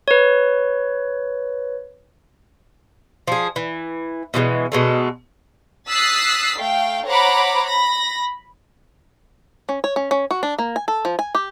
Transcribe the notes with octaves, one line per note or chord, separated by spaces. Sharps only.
B4 C#5
F3 G#4
E3
B2 E3 F3 G#3
B2 G#3 A3
D#6 E6 F#6 A6 B6 C7
A3 F5 G5
C5 C#5 F#5 A#5 B5 D6
B5 A#6
C#4
C#5
C#4
C#4
F#4
D4
A#3
G#5
A4
F3
G#5
G4